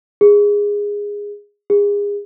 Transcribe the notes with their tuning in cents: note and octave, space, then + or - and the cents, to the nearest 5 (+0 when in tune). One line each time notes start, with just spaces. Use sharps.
G#4 -15
G#4 -30